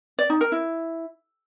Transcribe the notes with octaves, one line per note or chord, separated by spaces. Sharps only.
D5
D#4
A#4
E4